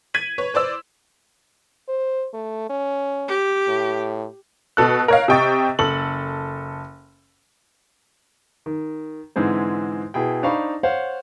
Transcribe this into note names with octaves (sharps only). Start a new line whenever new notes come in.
G#6 B6 D#7 F#7
B4 C#5
B4 C5 D5 E6
C5
A3
C#4
G4
A2
B2 A4 F#6
A#4 C#5 F5
C3 D#5 G5 C#6 A6
F#1 A4 F#7
D#3
G#2 D3 E3 G#3 C4 C5
B2 E4 G#4 G5
D4 D#4 C5 F5 B5 C#6
C5 C#5 F5 F#5